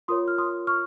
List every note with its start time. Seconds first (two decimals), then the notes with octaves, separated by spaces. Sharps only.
0.08 F4 A#4 C#5 C6 D#6
0.28 F6
0.38 C6 D#6
0.67 C#6 F6